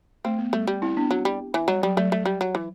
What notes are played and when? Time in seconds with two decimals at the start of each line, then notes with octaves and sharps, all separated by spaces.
0.24 A3 C4
0.39 B3
0.53 G3 A3
0.67 G3
0.82 C4 E4
0.97 B3 D4
1.11 F#3
1.25 G3
1.54 E3
1.68 F#3 G3
1.83 F#3 G3
1.97 F#3 A3
2.12 A3
2.25 G3
2.41 F#3
2.55 E3